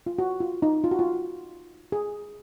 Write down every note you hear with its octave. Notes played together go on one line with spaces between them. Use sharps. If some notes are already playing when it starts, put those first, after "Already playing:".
F4
F#4
F4
D#4
F4
F#4
F4
G#4